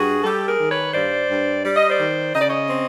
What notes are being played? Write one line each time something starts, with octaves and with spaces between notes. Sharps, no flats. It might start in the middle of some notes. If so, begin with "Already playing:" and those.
Already playing: G2 F#4 G#4
G3 G4 A4
G#4 A#4
D#3
B4 C#5
G2 C5 D5
G2
G3 D5
D#5
C5 D5
D#3
C#3 D#5
D5
C#5 D#5
C4